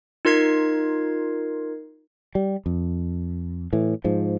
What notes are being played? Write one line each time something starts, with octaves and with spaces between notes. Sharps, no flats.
D#4 F4 A#4 G#6 C7
G3
F2
A2 E3
G#2 F3